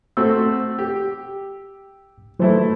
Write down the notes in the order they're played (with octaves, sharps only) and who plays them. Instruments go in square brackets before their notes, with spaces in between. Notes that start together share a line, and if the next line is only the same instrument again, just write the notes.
[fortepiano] A3 C4 F#4 [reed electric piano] E6
[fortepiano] G4
[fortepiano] E3 A3 E4 [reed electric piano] F#3 C5